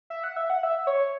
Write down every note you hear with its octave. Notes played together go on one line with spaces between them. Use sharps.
E5
F#5
E5
F#5
E5
C#5